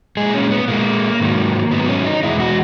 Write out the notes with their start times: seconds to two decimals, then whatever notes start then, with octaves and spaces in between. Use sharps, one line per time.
0.17 A#2 G#3 G#4
0.34 C#4
0.51 B3
0.68 A#2 G#3 A#3
1.20 G#2 D#3 F#3
1.71 G#2 D#3 F#3 B3
1.88 C#4
2.06 D#4
2.23 E2 B2 G#3 E4
2.40 F#4